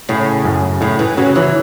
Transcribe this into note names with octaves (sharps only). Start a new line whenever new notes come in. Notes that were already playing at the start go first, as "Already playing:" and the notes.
A2 C#3
F#2
A2 C#3
E3
C#3 F#3
E3 F#3